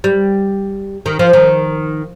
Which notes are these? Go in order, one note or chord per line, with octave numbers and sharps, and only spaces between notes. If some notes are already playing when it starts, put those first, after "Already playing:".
G3
D#3
F3
D#3